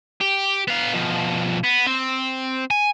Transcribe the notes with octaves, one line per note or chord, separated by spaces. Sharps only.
G4
B3 F5
B2 F3
B3
C4
G#5